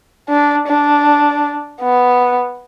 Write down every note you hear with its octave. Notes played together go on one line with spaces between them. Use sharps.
D4
D4
B3